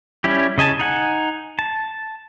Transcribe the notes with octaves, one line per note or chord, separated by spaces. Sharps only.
G3 C#4 E4 G4
C#3 D#5 G#5 A5
D#4 F#5 G#5
A5